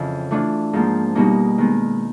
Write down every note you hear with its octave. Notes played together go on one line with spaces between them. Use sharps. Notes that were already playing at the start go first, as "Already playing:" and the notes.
Already playing: F2 C#3 E3
E3 A3 D4 F4
G#2 F3 A#3
B2 G3 A#3 D#4
D#3 G#3 B3